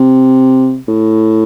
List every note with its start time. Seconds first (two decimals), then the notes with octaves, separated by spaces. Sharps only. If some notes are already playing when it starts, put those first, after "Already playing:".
Already playing: C3
0.88 A2